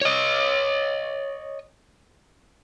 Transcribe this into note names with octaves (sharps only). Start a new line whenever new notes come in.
C#5 D#5